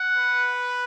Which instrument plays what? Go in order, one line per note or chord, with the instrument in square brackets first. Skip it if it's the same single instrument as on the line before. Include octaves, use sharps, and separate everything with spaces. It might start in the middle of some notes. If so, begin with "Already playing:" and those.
Already playing: [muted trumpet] F#5
[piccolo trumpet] B4